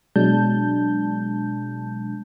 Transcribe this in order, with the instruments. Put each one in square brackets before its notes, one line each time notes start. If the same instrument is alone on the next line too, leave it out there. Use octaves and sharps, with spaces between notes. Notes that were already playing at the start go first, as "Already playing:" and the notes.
[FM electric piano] B2 F#3 G#3 D4 A5 G6